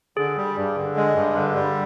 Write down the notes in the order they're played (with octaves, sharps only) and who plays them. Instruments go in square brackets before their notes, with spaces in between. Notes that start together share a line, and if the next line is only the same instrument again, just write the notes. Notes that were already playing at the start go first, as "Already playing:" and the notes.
[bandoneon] D3 [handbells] G#4
[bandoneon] G3
G2
D3
G#3
G2
D3
G3